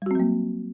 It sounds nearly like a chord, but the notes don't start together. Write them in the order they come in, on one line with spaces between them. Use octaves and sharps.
G3 F#4 C4 F#3 A#3